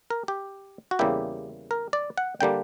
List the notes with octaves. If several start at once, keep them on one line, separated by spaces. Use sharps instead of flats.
A#4
G4
F#4
E2 C#3 G3 A#3 E4 G4
A#4
D5
F#5
D3 G3 A#3 D4 G5